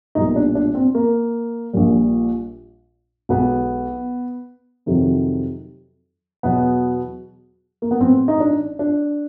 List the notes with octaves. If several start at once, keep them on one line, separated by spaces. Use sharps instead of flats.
B1 A#2 G3 D#4
D4
D4
C4
A#3
A#1 A#2 G3
B1 B2 G#3 B3
F2 C3 D#3 F#3
E2 B2 F#3 B3
A#3
B3
A1 A2 E3 C4
D#4
D4
D4